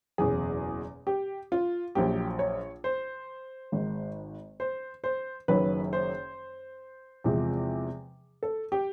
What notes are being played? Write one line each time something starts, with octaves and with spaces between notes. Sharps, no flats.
F#1 E2 B2 G#4
G4
F4
A#1 A#2 F#3 G4
C#5
C5
G#1 G#2 D#3
C5
C5
F#1 F#2 D#3 F#3 B4
C5
E2 C3 F3 G#3
A4
G4